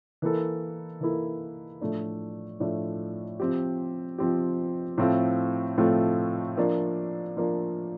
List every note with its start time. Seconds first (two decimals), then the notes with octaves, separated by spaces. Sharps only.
0.22 E3 A#3 E4 A4
1.01 E3 A#3 E4 A4
1.81 A2 F3 A3 D4
2.60 A2 F3 A3 D4
3.40 F3 C4 G4
4.18 F3 C4 G4
4.98 A2 F3 A3 C4 F4
5.78 A2 F3 A3 C4 F4
6.57 F3 A#3 D4
7.37 F3 A#3 D4